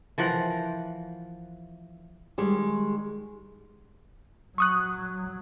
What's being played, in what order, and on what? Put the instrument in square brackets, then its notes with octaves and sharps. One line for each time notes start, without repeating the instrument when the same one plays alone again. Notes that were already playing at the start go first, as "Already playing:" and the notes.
[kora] E3 F3 A#4 F#5
[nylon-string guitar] D#3 G3 G#3
[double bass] F#3 [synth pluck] C#6 D#6 F#6